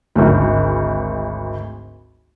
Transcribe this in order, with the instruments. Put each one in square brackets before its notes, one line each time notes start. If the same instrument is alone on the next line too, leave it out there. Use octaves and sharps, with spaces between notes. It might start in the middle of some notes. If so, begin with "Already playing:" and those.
[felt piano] G#1 D2